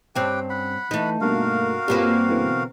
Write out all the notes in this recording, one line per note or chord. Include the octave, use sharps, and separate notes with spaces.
G2 C4 C#4 G4 B4 G5
F#5 B5
E3 A3 D#4
G2 B2 A#3 F#4 A#4 F5
G2 G3 A#3 C4 F4 B4 E6
B2 D3 E3